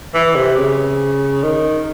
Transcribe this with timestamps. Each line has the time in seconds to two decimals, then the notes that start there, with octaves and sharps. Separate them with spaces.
0.14 E3
0.35 C3
0.57 C#3
1.43 D#3